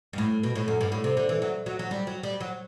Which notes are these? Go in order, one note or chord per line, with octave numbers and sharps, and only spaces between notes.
G2
A2
B2
A2
F#2
G2
A2
C3
D3
E3
F#3
F#3
F#3
G3
F#3
G3
F#3